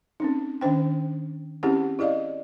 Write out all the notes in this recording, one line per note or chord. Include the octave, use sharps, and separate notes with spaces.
C4 C#4 D#4
D#3 C#4 D4 C5 G5
C4 C#4 E4 G4 G#4 F#5
E4 G#4 D5 D#5 F5